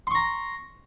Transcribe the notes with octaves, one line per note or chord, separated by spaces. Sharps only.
A#5 C6 C#6